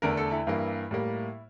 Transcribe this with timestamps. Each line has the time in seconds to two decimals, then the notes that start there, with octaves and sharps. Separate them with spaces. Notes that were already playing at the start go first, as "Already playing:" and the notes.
0.02 E2 D3 A3 A#4
0.17 A4
0.32 E4
0.47 G2 E3 A#3
0.91 A2 G3 A#3